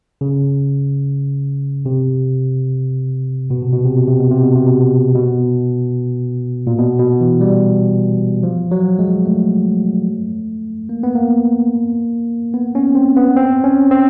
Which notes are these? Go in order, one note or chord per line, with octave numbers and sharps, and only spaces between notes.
C#3
C3
B2
C3
B2
C3
B2
C3
B2
C3
B2
C3
B2
B2
A#2
B2
B2
E3
G3
F3
F#3
G#3
A3
A#3
B3
A#3
B3
C#4
C4
B3
C4
C#4
C4